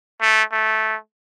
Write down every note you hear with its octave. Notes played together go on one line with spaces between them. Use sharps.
A3
A3